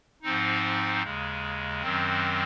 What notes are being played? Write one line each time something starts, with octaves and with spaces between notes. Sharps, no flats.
G#2 F3 C4 D#4
D#2 C#3 G#3
F#2 D#3 F#3 C4